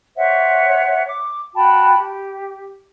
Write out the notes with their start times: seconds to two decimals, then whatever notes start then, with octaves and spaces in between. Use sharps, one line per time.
0.16 C5 C#5 E5 F#5
1.06 D6
1.55 F#4 G5 A5 B5
1.97 G4